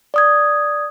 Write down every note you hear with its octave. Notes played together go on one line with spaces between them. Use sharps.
D5 D#6 G#6